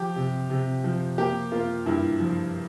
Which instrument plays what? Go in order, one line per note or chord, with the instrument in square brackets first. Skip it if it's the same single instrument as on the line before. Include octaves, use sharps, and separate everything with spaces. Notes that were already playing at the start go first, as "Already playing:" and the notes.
Already playing: [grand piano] F3 G4
C3
C3
F3
A#3 G4
A#3 F4
G2 E4
F3